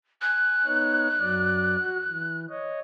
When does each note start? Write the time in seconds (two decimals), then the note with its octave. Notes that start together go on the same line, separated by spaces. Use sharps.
0.22 G#5 F#6
0.65 B3 D#4 C#5
1.20 F#2 F#3 D5
1.79 F#4
2.08 E3
2.49 C#5 D#5